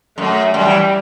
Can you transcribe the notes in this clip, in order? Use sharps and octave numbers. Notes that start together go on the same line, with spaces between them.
F#2 A3
F#2 G3
E3